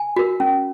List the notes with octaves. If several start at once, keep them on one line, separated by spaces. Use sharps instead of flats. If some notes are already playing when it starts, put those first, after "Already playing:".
Already playing: G#5
F#4 A#4
C#4